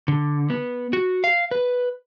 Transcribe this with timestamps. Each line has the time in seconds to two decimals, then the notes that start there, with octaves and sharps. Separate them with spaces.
0.08 D3
0.50 B3
0.93 F#4
1.24 F5
1.51 B4